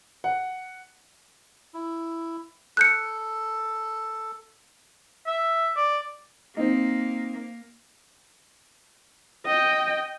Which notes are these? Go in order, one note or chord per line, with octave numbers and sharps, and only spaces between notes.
F#5
E4
A4 F#6 G6 C#7
E5
D5
A#3 C4 D#4
D#5 G5